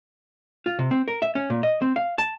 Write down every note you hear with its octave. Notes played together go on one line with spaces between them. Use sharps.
F4
C3
C4
A#4
E5
C#4
A#2
D#5
C4
F5
A5